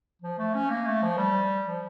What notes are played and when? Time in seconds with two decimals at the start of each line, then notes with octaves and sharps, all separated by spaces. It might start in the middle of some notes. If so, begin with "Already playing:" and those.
0.22 F3
0.38 A3
0.54 C#4
0.70 A#3
0.86 A3
1.02 F3
1.17 G3
1.66 F3